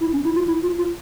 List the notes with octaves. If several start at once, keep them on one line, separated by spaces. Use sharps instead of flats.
E4
C#4
E4
F4
E4
F4
F4